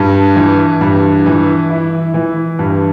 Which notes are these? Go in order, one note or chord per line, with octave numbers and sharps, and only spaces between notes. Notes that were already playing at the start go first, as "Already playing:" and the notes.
Already playing: G2
E3
G2
E3
E4
E3
G2